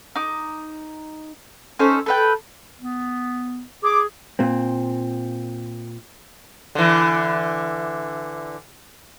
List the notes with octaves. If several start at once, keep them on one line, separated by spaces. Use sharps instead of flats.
D#4 D6
C#4 D#4 A4 C5
A4 B4 G5
B3
G#4 D6
A#2 C4
D3 E3